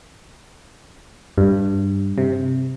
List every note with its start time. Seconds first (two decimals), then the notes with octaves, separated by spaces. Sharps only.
1.38 G2
2.18 C3